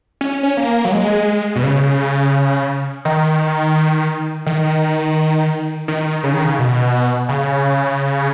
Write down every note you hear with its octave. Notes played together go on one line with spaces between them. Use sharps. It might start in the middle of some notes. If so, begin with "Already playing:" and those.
C#4
C#4
A#3
F#3
G#3
B2
C#3
D#3
D#3
D#3
C#3
D#3
C#3
B2
C#3